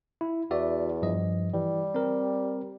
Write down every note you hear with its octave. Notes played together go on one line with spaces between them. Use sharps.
E4
E2 F#4 D5 E5
G2 F3 D#5
E3 G3
C4 A#4